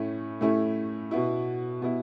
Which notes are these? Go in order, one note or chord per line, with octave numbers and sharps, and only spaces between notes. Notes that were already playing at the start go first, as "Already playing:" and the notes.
Already playing: A2 A3 C#4 E4
A2 A3 C#4 E4
B2 B3 E4
B2 B3 E4